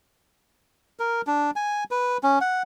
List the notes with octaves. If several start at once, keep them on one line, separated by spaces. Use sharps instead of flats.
A#4
D4
G#5
B4
C#4
F#5